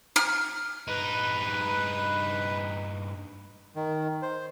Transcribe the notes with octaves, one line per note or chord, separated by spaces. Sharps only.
F6
G2 D#4 B4
D#3
C5